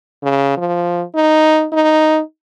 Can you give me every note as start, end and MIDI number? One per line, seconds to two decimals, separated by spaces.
0.23 0.53 49
0.57 1.03 53
1.15 1.67 63
1.73 2.20 63